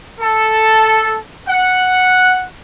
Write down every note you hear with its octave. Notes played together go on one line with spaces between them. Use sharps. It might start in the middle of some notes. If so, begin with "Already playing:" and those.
A4
F#5